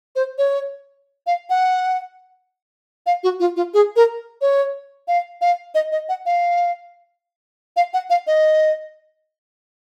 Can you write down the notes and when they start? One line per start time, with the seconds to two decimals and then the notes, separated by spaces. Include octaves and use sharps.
0.16 C5
0.38 C#5
1.27 F5
1.50 F#5
3.06 F5
3.23 F#4
3.40 F4
3.56 F4
3.74 G#4
3.96 A#4
4.41 C#5
5.08 F5
5.41 F5
5.75 D#5
5.92 D#5
6.09 F#5
6.26 F5
7.76 F5
7.94 F#5
8.10 F5
8.27 D#5